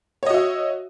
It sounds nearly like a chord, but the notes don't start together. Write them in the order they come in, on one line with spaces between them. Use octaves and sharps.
C#5 D#5 F#4 E5